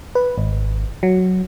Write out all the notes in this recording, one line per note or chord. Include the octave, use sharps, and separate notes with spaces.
B4
G#1
F#3